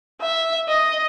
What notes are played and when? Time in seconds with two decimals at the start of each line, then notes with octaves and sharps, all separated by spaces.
0.21 E5
0.69 D#5